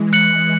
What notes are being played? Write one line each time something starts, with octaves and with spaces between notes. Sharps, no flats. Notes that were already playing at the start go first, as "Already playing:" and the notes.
Already playing: E3 G#3
F#6 C#7 F#7